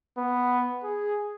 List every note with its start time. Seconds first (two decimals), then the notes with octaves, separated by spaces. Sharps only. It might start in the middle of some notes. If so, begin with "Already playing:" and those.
0.17 B3
0.84 G#4